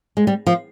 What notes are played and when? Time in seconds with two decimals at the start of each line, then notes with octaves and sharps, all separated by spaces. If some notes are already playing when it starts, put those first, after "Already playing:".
0.17 G#3
0.27 G3
0.47 F3